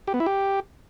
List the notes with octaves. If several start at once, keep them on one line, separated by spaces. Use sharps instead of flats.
G4
B3
E4
G4